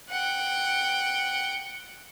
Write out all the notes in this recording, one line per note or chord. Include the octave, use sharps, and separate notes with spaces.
F#5 G5